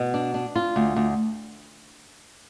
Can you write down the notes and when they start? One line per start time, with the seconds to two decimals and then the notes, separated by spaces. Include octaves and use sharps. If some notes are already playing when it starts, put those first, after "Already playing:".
Already playing: B2
0.14 D4
0.34 D4
0.56 F4
0.76 D2
0.96 D2